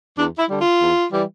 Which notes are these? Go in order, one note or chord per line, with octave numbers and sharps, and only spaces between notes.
E2 D4
E4
D3 G3
F4
E2
E3 G3